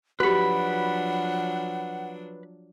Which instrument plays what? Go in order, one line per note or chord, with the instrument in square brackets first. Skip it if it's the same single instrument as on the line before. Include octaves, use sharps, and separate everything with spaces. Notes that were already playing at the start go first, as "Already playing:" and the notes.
[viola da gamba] F3 F#3 D4 [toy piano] F#4 G4 [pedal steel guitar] B4 B5 [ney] F#5